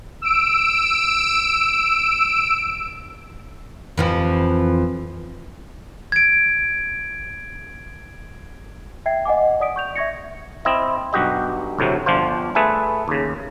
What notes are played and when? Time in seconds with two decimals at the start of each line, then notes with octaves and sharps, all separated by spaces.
0.22 E6 D7
3.98 F2 E3 F3
6.12 G#6 D7
9.06 E5 G5 G#6 C7
9.25 D#5 F#5 G#5 D6
9.60 D5 F#5 D#6 B6 D7
9.76 C#6 G6 F7
9.96 E5 C#6 G#6 A#6 C#7
10.65 C4 E4 D#5
11.13 B1 G2 F#4 G4 D#5
11.79 D2 A2 C3 F#3
12.06 G1 F3 D4 F4 C5
12.55 A3 G#4 B4 E5 G#5 A5
13.08 D#2 C#3